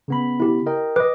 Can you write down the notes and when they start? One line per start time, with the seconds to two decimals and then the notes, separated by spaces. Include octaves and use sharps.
0.08 C#3 B3 B5
0.40 E4 G4
0.66 A#4 D#5 G5
0.96 B4 D#5 D6